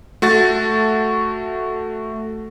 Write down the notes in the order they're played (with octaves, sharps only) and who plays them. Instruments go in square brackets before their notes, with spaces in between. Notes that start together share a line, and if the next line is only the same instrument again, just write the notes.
[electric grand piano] A3 F#4 C#6 A6